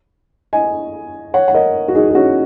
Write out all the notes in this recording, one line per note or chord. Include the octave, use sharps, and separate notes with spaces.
D#5 G#5
C#5 F#5
F#5
A#4 D#5
F#4
D#4 G#4
G#4
C#4 F#4